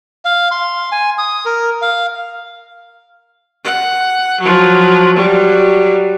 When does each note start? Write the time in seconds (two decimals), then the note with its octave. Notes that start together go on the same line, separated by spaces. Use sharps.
0.25 F5
0.51 C6
0.92 G#5
1.18 D#6
1.46 A#4
1.82 F5
3.64 F#5
4.41 F3 F#3
5.16 F#3 G3